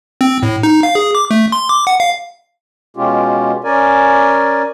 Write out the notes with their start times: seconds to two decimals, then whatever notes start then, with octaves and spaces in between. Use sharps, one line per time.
0.21 C4
0.43 A2
0.63 D#4
0.83 F5
0.95 G#4
1.15 D6
1.31 A3
1.52 C6
1.69 D6
1.87 F#5
2.00 F5
2.97 B2 G#3 C#4 F4 G4
3.64 C#4 A#4 D5 G#5